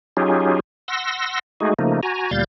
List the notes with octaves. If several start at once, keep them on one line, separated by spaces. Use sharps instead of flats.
F#3 C#4 D#4 F4 G4 G#4
F#5 C6 E6 A#6
G#3 A3 D#4 F#4 G#4
C#3 F3 A3 A#3 D#4
F#4 G#5 A#5
D2 A#2 G3 F5 G6 A6